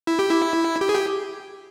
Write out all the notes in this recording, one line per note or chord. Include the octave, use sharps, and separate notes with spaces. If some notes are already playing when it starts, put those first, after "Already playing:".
E4
G4
E4
G4
G#4
G4